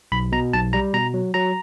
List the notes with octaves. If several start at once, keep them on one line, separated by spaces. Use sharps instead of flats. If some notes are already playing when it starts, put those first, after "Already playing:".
B1 B5
B2 A#5
B1 A5
G3 A#5
B2 A#5
F#3
F#3 A#5